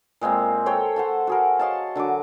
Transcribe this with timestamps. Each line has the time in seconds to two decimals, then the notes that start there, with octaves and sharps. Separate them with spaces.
0.21 A#2 G#3 A#3 C4
0.66 A4 C5 C#5 G5
0.96 C5 F#5 A5
1.27 F#4 G#4 A#4
1.59 C#5 D#5 F5 A5
1.96 D3 F#3 A#4 D6